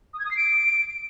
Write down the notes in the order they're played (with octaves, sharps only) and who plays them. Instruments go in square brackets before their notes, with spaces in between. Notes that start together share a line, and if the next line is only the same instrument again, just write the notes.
[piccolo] D#6
G#6
D#6
C7
D7